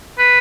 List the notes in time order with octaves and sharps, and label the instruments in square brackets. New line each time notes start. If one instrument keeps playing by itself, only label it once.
[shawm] B4